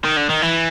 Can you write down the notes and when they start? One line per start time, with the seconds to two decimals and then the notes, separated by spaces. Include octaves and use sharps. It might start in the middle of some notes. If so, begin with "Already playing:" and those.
0.05 D#3
0.17 D3
0.29 D#3
0.42 E3